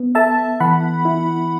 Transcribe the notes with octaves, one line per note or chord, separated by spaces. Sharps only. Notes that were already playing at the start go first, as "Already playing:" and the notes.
Already playing: B3
A4 E5 A5
E3 F#5 B5
E4